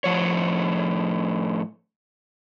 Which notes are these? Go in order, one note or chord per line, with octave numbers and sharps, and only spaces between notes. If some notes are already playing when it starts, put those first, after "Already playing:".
A2 F3 C#5